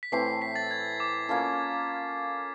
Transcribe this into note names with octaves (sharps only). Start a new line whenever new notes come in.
B6
A2 E3 A3 C4 C7
C7
B6
A6
G#6
D6
A#3 C#4 F4 A4